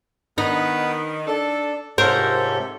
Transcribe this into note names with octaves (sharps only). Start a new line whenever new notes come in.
D#3 B3 D#4 B4
D4 A4
G#2 C3 F4 G4 A4 A#4 C5 C#5